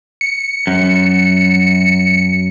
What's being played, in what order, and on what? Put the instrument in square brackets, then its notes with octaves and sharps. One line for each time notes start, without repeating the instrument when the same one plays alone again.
[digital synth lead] C#7
[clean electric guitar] F#2